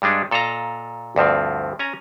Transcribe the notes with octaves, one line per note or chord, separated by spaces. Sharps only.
G2 G3 G#3 D4 D#4
A#2 A4 D#5 F5 A#5
D2 G2 F3 C4
C#4 G#5 A#5